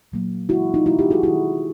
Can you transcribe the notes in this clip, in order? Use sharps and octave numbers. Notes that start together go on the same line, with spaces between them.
A#2 F#3 A#3
C#3 E3 G#3 E4 F#4
D#4 F4
B2 G3 A#3 E4 F#4
F4 G4
F#4 G#4
D#3 G#3 E4 F#4